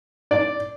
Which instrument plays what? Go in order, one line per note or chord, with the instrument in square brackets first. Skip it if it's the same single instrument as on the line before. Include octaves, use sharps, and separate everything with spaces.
[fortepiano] D5